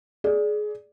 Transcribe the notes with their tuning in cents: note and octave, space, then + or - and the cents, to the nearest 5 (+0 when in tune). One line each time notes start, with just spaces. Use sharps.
G#4 +20 D5 +0